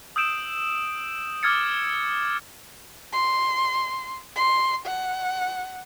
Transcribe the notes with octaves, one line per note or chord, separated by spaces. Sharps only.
D#6 E6 G6 D7 E7
D6 E6 F6 G#6 A6 C#7
C6
C6
F#5